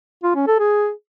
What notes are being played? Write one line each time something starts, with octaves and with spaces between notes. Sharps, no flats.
F4
C#4
A4
G#4